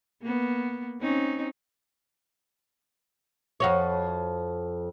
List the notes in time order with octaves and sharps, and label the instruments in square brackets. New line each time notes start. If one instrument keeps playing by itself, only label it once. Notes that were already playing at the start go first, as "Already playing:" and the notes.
[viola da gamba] A#3 B3
C4 C#4 D#4
[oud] F2 F#4 C#5